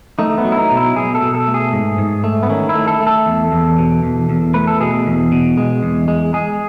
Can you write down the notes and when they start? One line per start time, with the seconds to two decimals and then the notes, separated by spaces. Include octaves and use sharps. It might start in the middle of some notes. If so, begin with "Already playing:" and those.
0.19 A3 D#4
0.38 B3
0.45 F#3
0.52 E4
0.58 D#4
0.71 B2
0.77 E4
0.96 B2 G#4
1.15 A4
1.22 B2
1.35 A4
1.47 A3
1.54 G#4
1.73 G#2
1.98 G#2
2.24 A3
2.43 B3
2.50 D#3 C#4
2.69 E4
2.75 A3
2.88 A4
3.00 A3
3.07 A4
3.26 E2
3.52 E2
3.78 B2
4.03 E2
4.30 E2
4.54 A3 B4
4.67 A4
4.80 B2 G#4
5.06 E2
5.32 B2
5.57 G#3
5.83 E2
6.08 G#3
6.34 G#3 G#4